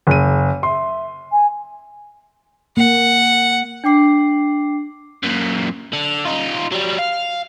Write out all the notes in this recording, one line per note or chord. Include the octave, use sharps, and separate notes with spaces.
F#1 D#7
E5 C6
G#5
A#3 F#5
D4 G5 D6 C7
F#2 A#2
D3
D#4 F4
F#3 G3
F5